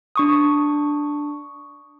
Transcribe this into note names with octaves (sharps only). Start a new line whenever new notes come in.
D4 C#6 D#6